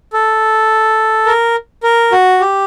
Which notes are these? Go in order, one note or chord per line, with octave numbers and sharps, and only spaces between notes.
A4
A#4
A#4
F#4
G4